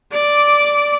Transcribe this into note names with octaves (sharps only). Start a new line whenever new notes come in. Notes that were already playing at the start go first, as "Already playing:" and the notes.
D5 D6